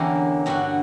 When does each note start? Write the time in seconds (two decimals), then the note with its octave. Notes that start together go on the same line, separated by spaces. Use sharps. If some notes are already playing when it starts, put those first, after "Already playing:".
Already playing: E2 D3 A#3 C#4 E4 G4
0.46 G2 D3 G3 F#4